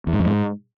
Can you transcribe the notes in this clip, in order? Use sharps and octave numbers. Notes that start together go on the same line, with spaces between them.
E2
G#2
F2
G#2